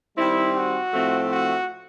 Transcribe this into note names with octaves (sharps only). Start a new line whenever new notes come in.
D#3 G3 C4 E4
F#4
A2 F3 A3 C4
F#4